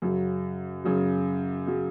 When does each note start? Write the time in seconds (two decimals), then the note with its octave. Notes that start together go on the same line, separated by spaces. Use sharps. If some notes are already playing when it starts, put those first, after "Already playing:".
0.02 F#2 C#3 F#3
0.84 F#2 C#3 F#3
1.67 C#3 F#3